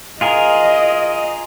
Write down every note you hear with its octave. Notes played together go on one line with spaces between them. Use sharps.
F4 G#4 A#4 D#5